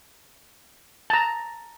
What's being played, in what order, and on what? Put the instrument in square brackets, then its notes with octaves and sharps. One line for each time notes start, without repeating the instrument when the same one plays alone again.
[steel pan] A5 A#5